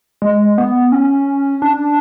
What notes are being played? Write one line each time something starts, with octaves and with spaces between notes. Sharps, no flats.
G#3
B3
C#4
D4